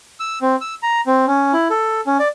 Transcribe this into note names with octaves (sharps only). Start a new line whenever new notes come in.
E6
C4
E6
A#5
C4
C#4
E4
A4
C#4
D5